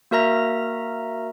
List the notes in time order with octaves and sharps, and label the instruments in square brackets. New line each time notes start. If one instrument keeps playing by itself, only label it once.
[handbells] A#3 F#4 A#4 E5 A#5 A#6